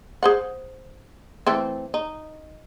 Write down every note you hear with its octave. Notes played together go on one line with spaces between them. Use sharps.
G#4 C5 F#5
E3 A3 C4
D#4